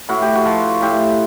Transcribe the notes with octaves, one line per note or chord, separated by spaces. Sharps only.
A2 F#4
G4
F#4
F3
A2 G4